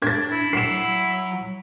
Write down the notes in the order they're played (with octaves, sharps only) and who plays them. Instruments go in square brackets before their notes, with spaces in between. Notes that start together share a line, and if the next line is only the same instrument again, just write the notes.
[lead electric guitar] D4 [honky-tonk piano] G#6 A6
[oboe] E4
[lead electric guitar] F#3 F#5 [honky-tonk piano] C7 E7